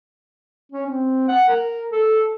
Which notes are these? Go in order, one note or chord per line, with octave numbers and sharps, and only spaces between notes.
C#4
C4
F#5
A#4
A4